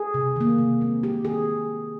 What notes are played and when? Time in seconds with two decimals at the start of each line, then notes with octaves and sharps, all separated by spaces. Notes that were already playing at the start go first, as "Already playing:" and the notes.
Already playing: G#4
0.14 C3
0.36 D#3 A#3
0.58 C3
0.80 D#3 G#3 C4
1.03 C3 G4
1.25 D#3 G#3 C4 G#4